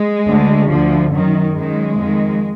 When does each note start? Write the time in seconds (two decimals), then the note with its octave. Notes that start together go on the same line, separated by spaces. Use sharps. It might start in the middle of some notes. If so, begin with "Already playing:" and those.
Already playing: G#3
0.26 D2 D3
0.68 D2 D3 F3
1.12 F#2 D#3 F#3
1.54 F#2 D#3 G#3
1.98 F2 D#3